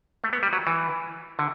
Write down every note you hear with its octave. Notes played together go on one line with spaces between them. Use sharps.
A3
B3
G3
F#3
E3
D3